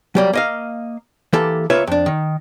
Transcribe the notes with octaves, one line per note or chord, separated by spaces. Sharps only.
F#3 G3 A#3
A#3 D#5 F5
E3 A#3 G4 A4
C#2 A#3 F4 B4 C#5 E5
F2 D4
D#3